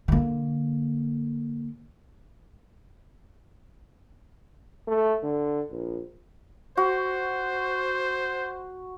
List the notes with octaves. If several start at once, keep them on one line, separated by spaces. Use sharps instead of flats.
D3 A#3
A3
D3
A#1
F#4 C5